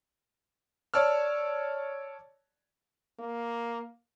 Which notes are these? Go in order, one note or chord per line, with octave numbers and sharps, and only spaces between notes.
C#5 D5 A5 E6 F6
A#3